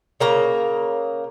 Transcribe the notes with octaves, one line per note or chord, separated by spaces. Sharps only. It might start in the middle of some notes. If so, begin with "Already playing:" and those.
C#3 A#3 A#5